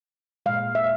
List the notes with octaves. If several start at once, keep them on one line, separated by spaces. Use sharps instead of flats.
A#2 G#3 F5
E5